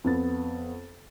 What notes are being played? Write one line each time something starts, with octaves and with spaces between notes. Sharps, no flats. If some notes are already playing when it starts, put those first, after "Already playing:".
F2 B3 A6